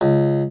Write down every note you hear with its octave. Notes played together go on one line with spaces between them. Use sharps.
C#2